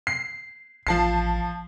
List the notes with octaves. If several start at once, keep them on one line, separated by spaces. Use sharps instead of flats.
C7
A1 F3 A5 C7